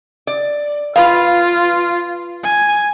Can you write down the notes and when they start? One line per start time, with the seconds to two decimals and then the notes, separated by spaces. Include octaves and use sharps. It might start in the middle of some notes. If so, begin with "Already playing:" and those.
0.27 D5
0.96 F4 B4 F5
2.43 G#5